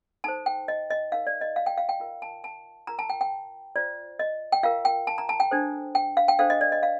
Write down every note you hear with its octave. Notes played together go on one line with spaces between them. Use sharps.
D#4 A4 C5 A5
G5
D#5
D#5
D#4 A#4 F5
D5
D#5
F5
G5
F5
G5
F4 A#4
A5
A5
F4 A#4 A#5
A5
G5
G5
F4 C5 D5
D#5
G5
F4 A#4 F5
G5
A5
A#5
A5
G5
D4 A4 C5
G5
F5
G5
D4 A4 C5 F5
D#5
D5
D#5
F5